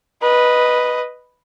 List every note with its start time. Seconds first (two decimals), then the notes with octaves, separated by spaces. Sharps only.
0.22 B4 D#5